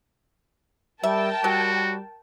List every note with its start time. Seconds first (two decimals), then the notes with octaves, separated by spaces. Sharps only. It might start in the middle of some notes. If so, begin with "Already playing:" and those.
1.03 G3 A#4 E5 G5 A5
1.44 F#3 G3 F#4